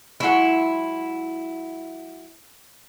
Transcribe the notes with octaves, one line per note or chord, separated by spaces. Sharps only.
F#3 G#3 E4 F#5